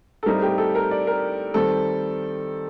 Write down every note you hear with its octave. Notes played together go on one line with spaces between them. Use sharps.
A4
A2 G3 C4 D#4 A#4
G4
A4
A#4
D5
A#4
D#3 G3 C4 A4